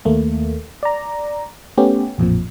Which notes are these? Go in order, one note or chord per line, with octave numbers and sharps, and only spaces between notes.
D#2 A3 A#3
D5 A#5
A3 B3 C#4 G4
A1 F2 A#2 F3